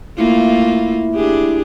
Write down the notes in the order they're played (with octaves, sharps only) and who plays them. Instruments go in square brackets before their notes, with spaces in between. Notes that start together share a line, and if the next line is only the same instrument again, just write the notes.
[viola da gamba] A3 A#3 F4 [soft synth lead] E4
[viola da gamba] D4 G4 G#4